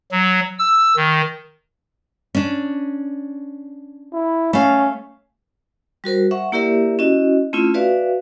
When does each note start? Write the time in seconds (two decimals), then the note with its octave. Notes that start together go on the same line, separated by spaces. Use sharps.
0.12 F#3
0.59 E6
0.97 D#3
2.35 C#4 D4
4.13 E4
4.53 A3 C#4 F5
6.04 G3 F#4 A#4 C5
6.31 E5 F#5 C#6
6.52 A#3 E4 G4 A#4 D5 E5
6.99 C#4 E4 F#4 D#5
7.53 A3 C4 C#4 E4 F4
7.74 F#4 B4 D5 E5 F5